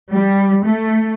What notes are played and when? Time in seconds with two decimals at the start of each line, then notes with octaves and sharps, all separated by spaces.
0.11 G3
0.64 A3